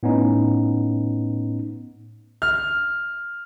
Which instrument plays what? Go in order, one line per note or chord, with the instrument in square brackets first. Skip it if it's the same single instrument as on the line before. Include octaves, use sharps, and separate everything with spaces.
[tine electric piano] A2 B3 C#4 D#4
[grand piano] F6